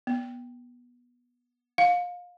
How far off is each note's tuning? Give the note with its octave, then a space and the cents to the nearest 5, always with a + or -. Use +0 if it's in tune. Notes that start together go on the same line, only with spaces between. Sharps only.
B3 -15
F5 +25